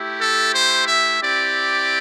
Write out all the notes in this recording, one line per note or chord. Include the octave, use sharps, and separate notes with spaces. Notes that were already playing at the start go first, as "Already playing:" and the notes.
Already playing: A3 E4 G4
A4
C5
E5
C4 E4 G4 D5